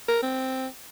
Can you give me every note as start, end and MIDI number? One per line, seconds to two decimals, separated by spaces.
0.08 0.19 70
0.23 0.67 60